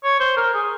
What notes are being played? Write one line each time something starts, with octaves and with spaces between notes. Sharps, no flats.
C#5
C5
A#4
G#4